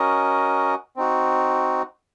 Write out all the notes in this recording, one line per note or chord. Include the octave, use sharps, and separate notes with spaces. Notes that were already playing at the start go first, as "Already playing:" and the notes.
Already playing: C#4 F#4 A#4 D#5
C4 D#4 F#4